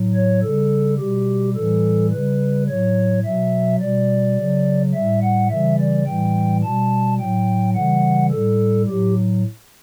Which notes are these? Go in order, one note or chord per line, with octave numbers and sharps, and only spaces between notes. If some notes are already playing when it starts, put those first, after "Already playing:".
Already playing: A2 F#3
C#5
C#3 G3 A4
B2 G3 G4
A2 E3 G3 A4
C#3 G3 B4
A2 F#3 C#5
B2 F#3 E5
B2 G3 D5
C#3 F#3
G3 E5
A2
F#5
C#3 E3 G3 E5
D5
A2 E3 G3 G5
B2 G3 A5
A2 F#3 G5
C#3 E3 G3 F#5
A2 G3 A4
A2 F#3 G4